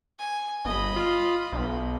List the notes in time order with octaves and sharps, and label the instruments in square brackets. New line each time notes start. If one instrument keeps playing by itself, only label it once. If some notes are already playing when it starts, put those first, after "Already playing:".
[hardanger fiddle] G#5
[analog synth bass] G1 [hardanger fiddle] D#5 B5
[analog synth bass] F4
B1